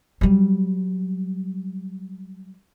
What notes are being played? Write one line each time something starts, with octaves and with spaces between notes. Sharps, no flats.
F#3 G3